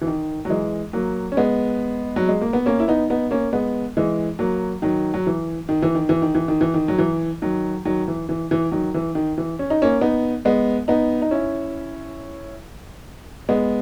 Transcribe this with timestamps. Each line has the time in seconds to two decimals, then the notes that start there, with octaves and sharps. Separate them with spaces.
0.01 E3
0.07 D#3
0.45 F#3
0.49 E3 G#3
0.93 F#3 A#3
1.32 C#4
1.37 G#3 B3
2.16 F#3
2.28 G#3
2.41 A#3
2.53 B3
2.66 A#3 C#4
2.80 E4
2.88 B3 D#4
3.10 B3 D#4
3.31 A#3 C#4
3.53 G#3 B3
3.97 E3 G#3
4.39 F#3 A#3
4.82 D#3 F#3
5.14 F#3
5.27 E3
5.69 D#3
5.82 E3
5.95 D#3
6.09 E3
6.22 D#3
6.35 E3
6.48 D#3
6.61 E3
6.74 D#3
6.88 F#3
6.98 E3
7.42 D#3 F#3
7.85 D#3 F#3
8.08 E3
8.29 E3
8.51 E3
8.72 D#3 F#3
8.94 E3
9.15 D#3
9.38 E3
9.59 C#4
9.70 D#4
9.82 A#3 C#4
10.01 B3 D#4
10.45 G#3 B3
10.88 B3 D#4
11.22 D#4
11.31 C#4 E4
13.49 G#3 B3